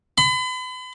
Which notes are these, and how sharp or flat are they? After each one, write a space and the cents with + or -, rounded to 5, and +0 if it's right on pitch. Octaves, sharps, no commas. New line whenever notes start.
B5 +40